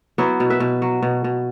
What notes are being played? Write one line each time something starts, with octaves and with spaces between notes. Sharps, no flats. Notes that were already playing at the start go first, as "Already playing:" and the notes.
F#3 B3 E4
B2
B4 E5
B2
F#3
B2
B2